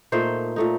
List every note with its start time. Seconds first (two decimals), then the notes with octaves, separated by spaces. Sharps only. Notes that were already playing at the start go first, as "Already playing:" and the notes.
0.12 A#2 A3 D#4 C5
0.56 A#2 A3 D#4